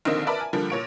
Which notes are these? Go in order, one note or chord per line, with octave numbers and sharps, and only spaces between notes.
A#1 D3 D#3 A#3 C4 D#5
A#4 B4 D5 E5 A5 B5
G#5
D3 F3 G3 A#3
A#2 C#5 D7